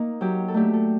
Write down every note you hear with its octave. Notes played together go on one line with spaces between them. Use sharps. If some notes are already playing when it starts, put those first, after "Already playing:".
Already playing: A#3 D#4
F#3 G4
A4
A3 D4 G4
A4